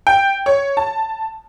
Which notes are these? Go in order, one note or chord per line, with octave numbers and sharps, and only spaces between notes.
G5
C#5
A5